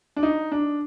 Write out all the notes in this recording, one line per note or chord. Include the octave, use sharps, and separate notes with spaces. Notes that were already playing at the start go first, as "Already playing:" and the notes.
D4
D#4
D4